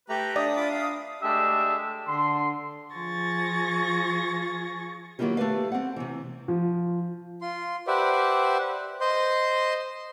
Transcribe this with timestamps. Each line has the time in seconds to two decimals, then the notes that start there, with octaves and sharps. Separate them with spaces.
0.09 A3 G4 B4 G5 A#5
0.36 D4 D5 E5 D#6
0.56 F4 B5 D6
0.70 F5
1.22 G#3 A3 D4 G4 E5
2.08 D3 C6
2.94 F3 F4 G#4 C#6 A6 A#6
5.19 D#3 F#3 A#3 E4 F4 G4
5.37 A3 G4 B4 F5
5.72 C4 F#5
5.96 C3 E3
6.48 F3
7.41 F4 C6
7.87 G4 B4 C5 D5 E5 F#5
9.01 C5 D#5 C6 G6